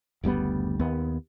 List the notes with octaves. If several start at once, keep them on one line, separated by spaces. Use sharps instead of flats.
F#1 D2 G3 B3
D#2 B3